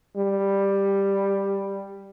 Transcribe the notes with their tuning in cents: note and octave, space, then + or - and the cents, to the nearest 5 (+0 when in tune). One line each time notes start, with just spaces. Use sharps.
G3 +10